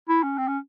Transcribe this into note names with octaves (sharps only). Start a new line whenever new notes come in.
E4
C#4
C4
C#4